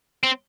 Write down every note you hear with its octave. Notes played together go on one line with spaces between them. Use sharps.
C4